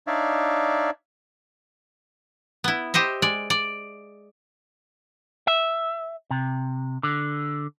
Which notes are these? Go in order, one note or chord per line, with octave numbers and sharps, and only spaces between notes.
D4 D#4 C#5 D5 E5 F5
B3 E4
G4 C5 D#5 E5
G#3 D5
D5
E5
C3
D3